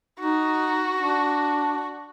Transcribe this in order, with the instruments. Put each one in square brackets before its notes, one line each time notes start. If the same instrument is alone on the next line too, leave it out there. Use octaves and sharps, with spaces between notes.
[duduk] D#4 [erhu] F#4
[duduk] D4